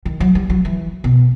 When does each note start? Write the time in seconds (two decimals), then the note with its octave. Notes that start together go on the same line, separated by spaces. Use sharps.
0.05 D#3
0.20 F#3
0.35 G3
0.50 F#3
0.65 E3
1.04 B2